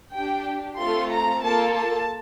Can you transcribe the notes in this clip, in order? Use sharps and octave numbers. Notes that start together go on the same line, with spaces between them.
D4 G4 G5
A3 C4 F4 A4 C6
A#5
A#3 F4 A4 A5
A5